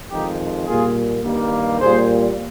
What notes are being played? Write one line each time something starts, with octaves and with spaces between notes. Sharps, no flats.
F2 D#3 G#3 D#4 G4
A#2 G3 A#3 F4 G#4
G2 D#3 G3 A#3
A#2 G3 A#3 G#4 C5